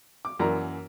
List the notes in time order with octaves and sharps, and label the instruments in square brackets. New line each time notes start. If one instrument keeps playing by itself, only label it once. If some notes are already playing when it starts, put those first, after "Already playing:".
[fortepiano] D6
F#2 E3 A#3 D5 A#5